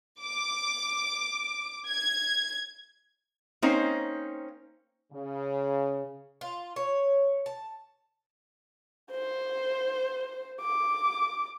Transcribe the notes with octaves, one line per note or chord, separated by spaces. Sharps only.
D6
G#6
A#3 C4 C#4 D#4 C5
C#3
F4
C#5
A5
C5
D6